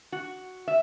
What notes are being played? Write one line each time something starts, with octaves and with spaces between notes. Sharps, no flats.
F#4
E5